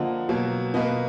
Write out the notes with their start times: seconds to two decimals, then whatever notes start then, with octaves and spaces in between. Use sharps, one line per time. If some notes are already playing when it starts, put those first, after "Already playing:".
Already playing: D3 F3 A#3 D#5 F#5
0.29 B2 F#3 A#3
0.74 B2 A#3 B4 D#5